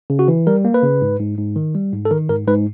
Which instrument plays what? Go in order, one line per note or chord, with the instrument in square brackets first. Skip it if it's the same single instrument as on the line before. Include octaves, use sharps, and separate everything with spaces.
[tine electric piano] C#3
F#4
E3
G3 A#4
A#3
B4
C#3
G#2
G#2
G#2
D#3
G3
G#2
A4
D#3 A#4
G#2 A#4
G#2 B4